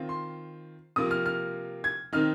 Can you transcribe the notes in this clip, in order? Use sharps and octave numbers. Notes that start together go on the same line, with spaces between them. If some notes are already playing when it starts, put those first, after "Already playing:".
Already playing: D#3 C4 F4
C6
C3 F3 A#3 D#6
F6
F6
G#6
D#3 C4 D#4 F6